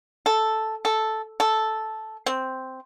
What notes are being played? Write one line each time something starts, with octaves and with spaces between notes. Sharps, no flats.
A4
A4
A4
C4